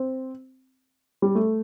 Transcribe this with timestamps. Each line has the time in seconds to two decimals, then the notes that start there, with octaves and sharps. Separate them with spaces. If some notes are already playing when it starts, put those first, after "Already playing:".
Already playing: C4
1.22 G3
1.35 A3